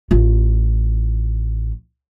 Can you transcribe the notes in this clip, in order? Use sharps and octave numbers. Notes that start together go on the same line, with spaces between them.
A1 F4